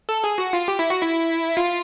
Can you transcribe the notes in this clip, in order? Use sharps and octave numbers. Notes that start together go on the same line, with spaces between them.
A4
G#4
F#4
F4
G4
E4
F#4
E4
F4